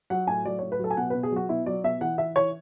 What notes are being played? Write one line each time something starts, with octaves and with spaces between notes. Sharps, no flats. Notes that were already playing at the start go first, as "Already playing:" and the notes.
F#3 F#5
A2 G#5
F#3 D5
A2 C#5
B4
F#3 A4
G#5
B2 F#5
B4
B2
G#4
F#3 F#4
B2 E4
F#3 D5
B2 E5
E3 F#5
E3 E5
E3 C#5